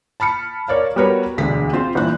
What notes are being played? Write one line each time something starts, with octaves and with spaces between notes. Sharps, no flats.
A5 B5 F6 C#7
A#4 C#5 D5 F5
G3 B3 F#4 A#4 B4 C#5
E1 D2 G#3 D4 B6
C4 F4 C5
G1 A#2 E3 F#6